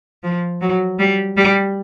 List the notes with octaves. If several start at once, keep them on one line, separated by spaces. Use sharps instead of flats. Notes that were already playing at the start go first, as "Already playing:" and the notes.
F3
F#3
G3
G3